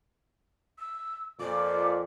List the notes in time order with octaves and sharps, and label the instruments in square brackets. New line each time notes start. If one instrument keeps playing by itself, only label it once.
[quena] E6
[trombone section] F2 A#2 [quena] D6